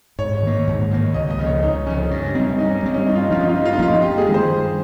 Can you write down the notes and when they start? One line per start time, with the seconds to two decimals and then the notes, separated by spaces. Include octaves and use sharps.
0.19 G#2 C#5
0.43 D#3 A#3
0.67 G#2
0.91 D#3 A#3
1.14 C#2 D#5
1.30 D#5
1.39 C#3 F3
1.46 C#5
1.63 C#2 D#4
1.86 C#3 F3 C#4
2.11 G2 C#4
2.35 G3 C4 D#4
2.58 G2 D#4
2.70 C#4
2.83 G3 C4
2.94 C#4
3.07 G2 D#4
3.15 F4
3.23 D#4
3.30 F3 A#3 C#4 F4
3.40 D#4
3.49 F4
3.54 G2 D#4
3.65 F4
3.73 D#4
3.78 F3 A#3 C#4 F4
3.91 D#4
4.02 G2 G4
4.18 G#4
4.26 D#3 G#3
4.34 C5
4.50 G2